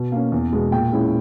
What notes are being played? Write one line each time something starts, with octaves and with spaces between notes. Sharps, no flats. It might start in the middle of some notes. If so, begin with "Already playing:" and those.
Already playing: B2
A#3 C#4
E2
B2 G#3
A#2 G5
G#3 C#4 E4